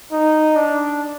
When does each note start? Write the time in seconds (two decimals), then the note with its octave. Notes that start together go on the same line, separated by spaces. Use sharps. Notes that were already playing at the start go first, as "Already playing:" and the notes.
0.11 D#4
0.56 D4